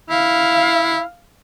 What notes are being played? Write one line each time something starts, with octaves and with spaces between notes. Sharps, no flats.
E4 F5